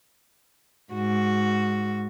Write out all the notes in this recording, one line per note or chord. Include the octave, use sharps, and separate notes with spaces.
G#2 F#4